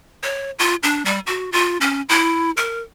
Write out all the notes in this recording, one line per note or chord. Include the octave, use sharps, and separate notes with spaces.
C#5
F4
D4
G3
F#4
F4
C#4
E4
A#4